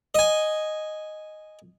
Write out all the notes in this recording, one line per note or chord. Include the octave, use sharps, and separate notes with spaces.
D#5 G#5